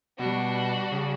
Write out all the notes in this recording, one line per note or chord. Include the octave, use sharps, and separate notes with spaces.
B2 G3 D4 F#4
C#3